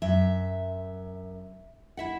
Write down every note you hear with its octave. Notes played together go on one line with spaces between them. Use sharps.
F#2 E5
E4 E5 F#5